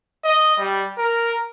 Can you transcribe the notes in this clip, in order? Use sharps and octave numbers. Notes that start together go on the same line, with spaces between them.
D#5
G3
A#4